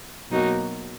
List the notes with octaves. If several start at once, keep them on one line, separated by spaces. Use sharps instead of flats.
B2 F#3 A#3 D#4 F#4